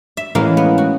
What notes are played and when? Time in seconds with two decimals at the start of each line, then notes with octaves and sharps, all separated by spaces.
0.17 E5
0.35 A2 E3 G#3 A#3 C#4 F5
0.57 B3
0.78 F#4